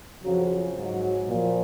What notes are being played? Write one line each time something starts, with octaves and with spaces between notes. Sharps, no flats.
F2 C#3 F3 F#3 F#4
G#2 F#3
A#2 F3